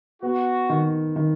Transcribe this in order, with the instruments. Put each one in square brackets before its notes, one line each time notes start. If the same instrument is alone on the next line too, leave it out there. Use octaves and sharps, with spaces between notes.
[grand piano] B3 [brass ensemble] F#4
[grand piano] D#3
D#3